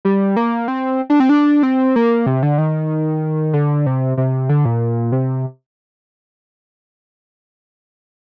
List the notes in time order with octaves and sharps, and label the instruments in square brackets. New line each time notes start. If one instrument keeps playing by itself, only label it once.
[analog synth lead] G3
A#3
C4
D4
C4
D4
C4
A#3
C3
D3
D#3
D3
C3
C3
D3
A#2
C3